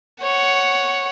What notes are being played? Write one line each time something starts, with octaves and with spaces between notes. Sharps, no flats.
C#5 F#5